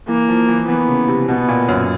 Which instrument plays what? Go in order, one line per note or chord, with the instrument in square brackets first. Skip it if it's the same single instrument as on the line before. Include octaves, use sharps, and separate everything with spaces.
[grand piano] E3 [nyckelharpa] A#3
[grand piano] F3
E3
[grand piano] E3 [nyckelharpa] B3
[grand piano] C#3
C3
[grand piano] B2 [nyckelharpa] B3
[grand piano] A#2
F#2